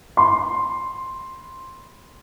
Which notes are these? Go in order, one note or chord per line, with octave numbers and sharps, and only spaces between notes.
B5 C6